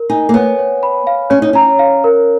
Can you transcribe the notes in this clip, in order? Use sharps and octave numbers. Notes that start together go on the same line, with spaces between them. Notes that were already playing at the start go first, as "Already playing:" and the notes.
Already playing: A#4
D#4 G#5
A#3
B3 C#5
C#5
B5
F5
C#4 C#5
D#4
C#4 A#5
F5
A#4